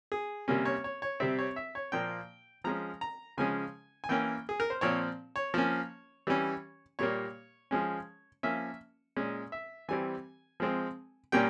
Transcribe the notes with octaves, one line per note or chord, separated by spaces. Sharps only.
G#4
C3 G3 A#3 C#4
C#5
C#5
C#5
C3 G3 C4 E5
C#5
E5
C#5
A#2 F3 A#3 G5
F3 G#3 C#4 A#5
A#5
C#3 F3 G#3 C#4 G#5
G#5
E3 A#3 C#4 G5
G#4
A#4
C5
A#2 F3 C4 C#5
C#5
F3 A#3 C#4
E3 G3 C#4
A#2 G3 A#3 C#5
F3 G#3 C#4
F3 A#3 C#4 E5
A#2 G#3 C#4
E5
E3 G3 C4 G#5
F3 G#3 C4
A#2 G3 A#3 C#4 G5